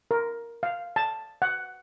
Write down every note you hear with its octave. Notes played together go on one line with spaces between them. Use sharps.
A#4
F5
A5
F#5